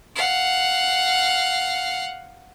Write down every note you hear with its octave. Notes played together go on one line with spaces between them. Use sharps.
F5 F#5